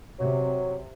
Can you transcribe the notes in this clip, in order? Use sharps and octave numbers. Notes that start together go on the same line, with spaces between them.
C3 F#3